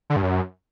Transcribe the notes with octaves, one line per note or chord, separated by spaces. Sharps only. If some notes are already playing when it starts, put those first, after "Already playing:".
D3
G2
F#2